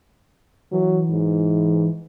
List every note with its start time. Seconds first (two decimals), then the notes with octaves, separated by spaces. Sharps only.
0.72 E3 F#3
1.10 G#2